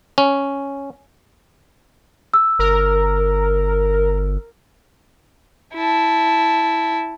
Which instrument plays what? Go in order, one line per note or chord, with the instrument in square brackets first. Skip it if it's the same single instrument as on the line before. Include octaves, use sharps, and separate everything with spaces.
[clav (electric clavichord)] C#4
[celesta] E6
[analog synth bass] G1 [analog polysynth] A#4
[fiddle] E4 A5